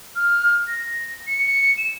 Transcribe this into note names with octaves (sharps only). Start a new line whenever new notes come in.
F6
A#6
C#7
E7